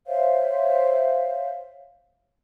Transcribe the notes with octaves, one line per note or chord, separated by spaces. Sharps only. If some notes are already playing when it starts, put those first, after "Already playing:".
C5 C#5 E5 F5